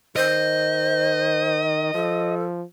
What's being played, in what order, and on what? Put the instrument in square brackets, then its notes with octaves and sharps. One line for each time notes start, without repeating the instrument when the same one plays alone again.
[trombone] D#3 [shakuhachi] C5 [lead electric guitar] D#5
[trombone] F3 [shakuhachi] A4